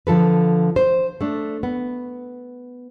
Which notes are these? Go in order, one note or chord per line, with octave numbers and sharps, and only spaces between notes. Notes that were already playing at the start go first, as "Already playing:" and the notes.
D3 F3 A4 B4
C5
A3 D4
B3